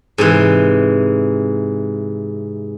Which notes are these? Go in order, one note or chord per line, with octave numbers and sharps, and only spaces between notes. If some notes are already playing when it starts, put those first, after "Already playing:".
G#2 C3 E3